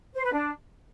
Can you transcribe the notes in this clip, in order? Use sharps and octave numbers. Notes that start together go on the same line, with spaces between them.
C5
B4
D4